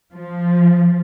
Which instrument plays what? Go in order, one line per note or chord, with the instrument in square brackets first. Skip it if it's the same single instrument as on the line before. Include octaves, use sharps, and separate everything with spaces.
[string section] F3